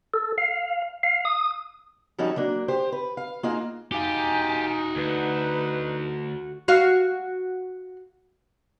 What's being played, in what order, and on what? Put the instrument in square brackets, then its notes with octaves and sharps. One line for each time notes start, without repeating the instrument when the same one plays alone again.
[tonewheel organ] A4
F5
F5
D#6
[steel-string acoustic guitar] F3 G3 C#4 D#4 F#4 A4
F#3 A#3 D4
G4 C5
B4
F5
A#3 D#4 F4 F#4 G#4
[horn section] D#4 [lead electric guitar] F#4 F5 [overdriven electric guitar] G4 [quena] G#5
[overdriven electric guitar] D2 [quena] B4
[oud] F#4 F5